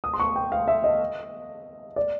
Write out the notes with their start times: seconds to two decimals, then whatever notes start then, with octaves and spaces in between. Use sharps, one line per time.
0.04 D#6
0.14 C6
0.20 C#6
0.36 G5
0.52 F5
0.68 E5
0.84 D#5
1.96 D5